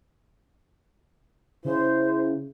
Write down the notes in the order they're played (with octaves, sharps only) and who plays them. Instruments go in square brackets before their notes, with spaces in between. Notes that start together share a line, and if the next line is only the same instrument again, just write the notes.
[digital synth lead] C#3 [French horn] E4 [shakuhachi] C5